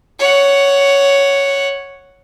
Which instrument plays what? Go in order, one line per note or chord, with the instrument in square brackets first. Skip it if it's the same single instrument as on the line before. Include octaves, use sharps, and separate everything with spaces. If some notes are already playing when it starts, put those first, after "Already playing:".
[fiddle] C#5 F#5